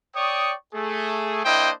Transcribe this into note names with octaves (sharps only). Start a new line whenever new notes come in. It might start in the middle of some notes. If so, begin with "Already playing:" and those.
C#5 D5 G5 C#6 D#6
A3 G#4
A#3 D4 E4 C5 D#5 G5